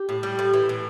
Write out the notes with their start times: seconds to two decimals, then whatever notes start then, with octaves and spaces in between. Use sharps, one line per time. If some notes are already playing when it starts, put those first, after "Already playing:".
Already playing: G4
0.09 A2
0.23 G3
0.39 A2
0.53 E3
0.69 A2